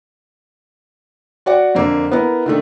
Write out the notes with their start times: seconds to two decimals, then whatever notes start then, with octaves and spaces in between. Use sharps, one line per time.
1.46 F#4 D5 F#5
1.75 F2 D3 A#3
2.11 B3 E4 A#4
2.46 D3 D#3 A3